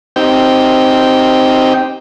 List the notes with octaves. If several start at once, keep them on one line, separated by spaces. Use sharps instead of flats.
C4 D#4 G4 G5